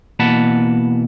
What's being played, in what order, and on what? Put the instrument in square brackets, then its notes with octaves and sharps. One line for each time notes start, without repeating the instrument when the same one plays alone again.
[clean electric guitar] B2 E3 A#3 F#5 A5 B5